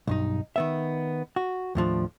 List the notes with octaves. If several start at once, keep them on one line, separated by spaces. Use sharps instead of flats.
B1 G2 D#4
D#3 B3 E5
F#4
D#2 A2 F3 D4